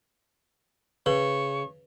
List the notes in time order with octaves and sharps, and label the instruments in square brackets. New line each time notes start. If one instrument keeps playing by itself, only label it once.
[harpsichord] C#3 [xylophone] B4 [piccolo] C#6